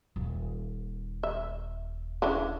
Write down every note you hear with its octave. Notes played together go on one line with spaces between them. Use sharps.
D#1 A#3
E5
C#3 E3 D4